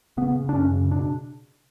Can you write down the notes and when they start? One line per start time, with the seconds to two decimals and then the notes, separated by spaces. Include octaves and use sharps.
0.17 C#3 B3
0.36 C#3
0.49 D4
0.53 F#2 C#4
0.72 C#3
0.91 B2 D4